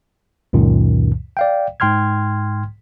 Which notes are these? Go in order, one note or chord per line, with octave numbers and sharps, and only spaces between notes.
C#2 F#2 A#2 D#3
D5 F5 G5
G#2 G5 C6 F6 G#6